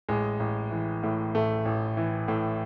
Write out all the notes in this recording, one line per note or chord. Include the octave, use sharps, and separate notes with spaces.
A1 G#3
A1
E3
A2
A1 A3
A1
E3
A2